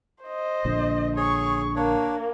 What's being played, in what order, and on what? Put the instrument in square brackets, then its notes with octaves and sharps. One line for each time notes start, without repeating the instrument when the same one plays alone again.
[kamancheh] C5 D#5
[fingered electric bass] A#1 A#2 D3
[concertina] G#4 C#5 [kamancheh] C#6
[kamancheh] A#3 [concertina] D4 C#5